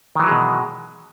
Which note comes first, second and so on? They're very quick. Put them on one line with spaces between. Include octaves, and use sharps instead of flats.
D#3 E3 F#3 G#3 B2